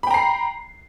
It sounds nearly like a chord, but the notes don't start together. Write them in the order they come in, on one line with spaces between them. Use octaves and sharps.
B5 G5 A#5 C7